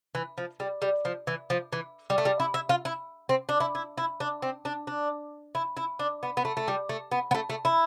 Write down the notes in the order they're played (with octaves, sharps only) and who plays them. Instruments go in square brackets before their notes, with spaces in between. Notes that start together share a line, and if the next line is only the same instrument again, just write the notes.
[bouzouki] E3
F3
G3
G3
F3
E3
F3
E3
G3
A3
G3
E4
E4
F4
E4
C4
D4
E4
E4
E4
D4
C4
D4
D4
E4
E4
D4
B3
B3
A3
A3
G3
A3
B3
B3
A3
A3
E4